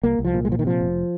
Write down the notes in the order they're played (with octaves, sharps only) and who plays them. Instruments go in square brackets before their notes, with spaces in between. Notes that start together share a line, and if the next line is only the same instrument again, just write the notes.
[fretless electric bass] C2 A#3
C2
F3
A#2
G#3
A#2 F3
D#3
C3 F3
F1